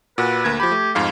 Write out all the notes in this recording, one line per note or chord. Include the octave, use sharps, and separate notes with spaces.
A#2 F#4 B4
D2 A#3 G#6
F3 G4 B5
A3
F2 G#2 F5